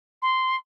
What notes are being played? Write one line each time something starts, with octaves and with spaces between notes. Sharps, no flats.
C6